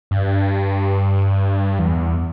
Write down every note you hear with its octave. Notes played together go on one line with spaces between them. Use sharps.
G2
E2